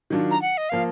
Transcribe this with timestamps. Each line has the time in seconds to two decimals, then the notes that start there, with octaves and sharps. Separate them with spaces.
0.10 D#3 F#3 D4 F4
0.31 A#5
0.42 F#5
0.57 D#5
0.69 F3 A#3 F5